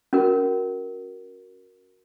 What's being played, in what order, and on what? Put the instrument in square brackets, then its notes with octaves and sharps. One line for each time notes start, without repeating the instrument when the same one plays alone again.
[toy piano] C#4 F#4 A#4